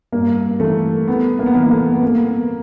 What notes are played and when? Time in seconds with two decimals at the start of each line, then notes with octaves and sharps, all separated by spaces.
0.12 G2 A#3
0.60 E3 A3
1.07 C2 B3
1.39 A#3
1.46 B3
1.55 C3 E3 A#3
1.71 A3
1.94 B3
2.02 C2 A#3